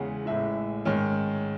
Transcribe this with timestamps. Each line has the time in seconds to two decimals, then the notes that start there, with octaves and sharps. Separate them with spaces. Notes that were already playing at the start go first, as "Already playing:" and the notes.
Already playing: E2 C#3 G#3 C#4 F#5
0.26 A1 A2 G#3 E5
0.85 G#2 D#3 G#3 C#4